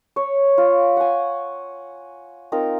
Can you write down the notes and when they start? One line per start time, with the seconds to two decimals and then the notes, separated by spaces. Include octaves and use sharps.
0.16 C#5
0.58 F4
0.97 F#5 G#5
2.52 C4 D#4 F4 A#4